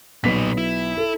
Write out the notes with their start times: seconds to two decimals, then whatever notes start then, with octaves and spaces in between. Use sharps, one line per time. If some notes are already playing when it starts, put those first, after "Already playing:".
0.24 B1 A#2 B3 D#4 B6
0.57 E4
0.97 A4